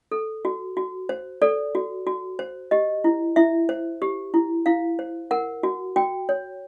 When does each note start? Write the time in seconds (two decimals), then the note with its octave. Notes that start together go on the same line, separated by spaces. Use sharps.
0.12 A4
0.45 F#4
0.77 F#4
1.09 C5
1.42 A4 D5
1.75 F#4
2.07 F#4
2.39 C5
2.71 G4 D#5
3.04 E4
3.36 E4 E5
3.69 C5
4.02 G4
4.34 E4
4.66 E4 F5
4.99 C5
5.31 A#4 F#5
5.63 F#4
5.96 F#4 G5
6.29 C#5